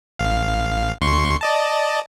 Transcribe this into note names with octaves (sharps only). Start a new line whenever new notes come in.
A1 F5
D2 C6 C#6
D5 D#5 A5